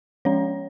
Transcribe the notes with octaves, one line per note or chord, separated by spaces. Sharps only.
F3 G#3 C#4 C#5